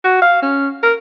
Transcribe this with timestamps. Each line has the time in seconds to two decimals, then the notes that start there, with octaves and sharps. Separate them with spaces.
0.04 F#4
0.22 F5
0.42 C#4
0.83 A#4